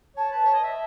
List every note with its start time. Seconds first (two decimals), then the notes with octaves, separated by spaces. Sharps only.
0.16 C#5 A5
0.32 B4
0.45 C#5
0.54 D#5
0.64 E5